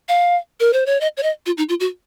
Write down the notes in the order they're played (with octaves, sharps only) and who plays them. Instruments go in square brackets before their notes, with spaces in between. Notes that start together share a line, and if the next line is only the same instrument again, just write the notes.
[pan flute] F5
A#4
C5
C#5
D#5
C#5
D#5
F4
D#4
F4
F#4